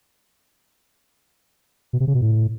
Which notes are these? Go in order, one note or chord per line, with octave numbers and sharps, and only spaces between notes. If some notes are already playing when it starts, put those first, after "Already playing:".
B2
C3
C#3
B2
A2